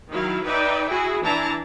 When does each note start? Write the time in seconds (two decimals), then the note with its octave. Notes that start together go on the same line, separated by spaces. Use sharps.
0.10 D#3 F#3 E4 F5
0.44 D#4 B4 D5 E5 G5
0.88 E4 F#4 G#4
1.25 E3 D4 E4 A5 A#5